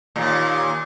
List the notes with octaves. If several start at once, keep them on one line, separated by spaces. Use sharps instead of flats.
D#2 A#2